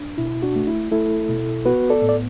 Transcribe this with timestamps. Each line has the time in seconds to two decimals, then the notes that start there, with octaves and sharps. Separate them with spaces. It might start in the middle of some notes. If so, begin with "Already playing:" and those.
Already playing: D4
0.18 B2 E4
0.42 D4 F#4
0.55 A3
0.67 E4
0.92 A3 E4 A4
1.28 B2
1.65 B3 F#4 B4
1.90 A4 D5
2.02 A2
2.09 D5